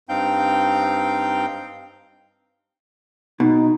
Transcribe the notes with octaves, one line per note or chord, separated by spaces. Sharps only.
G2 C4 D#4 F5 G5 G6
B2 D#4